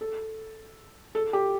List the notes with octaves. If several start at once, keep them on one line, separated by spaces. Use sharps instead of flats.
A4
A4
G4